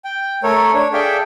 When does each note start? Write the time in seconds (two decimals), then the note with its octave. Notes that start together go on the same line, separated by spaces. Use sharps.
0.05 G5
0.43 A3 A4 A#4 C#5
0.74 D4 C#5
0.93 G#4 A4 D5 E5 F5 G5